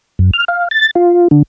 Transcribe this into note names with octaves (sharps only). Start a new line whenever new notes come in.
F#2
F6
F5
A6
F4
D3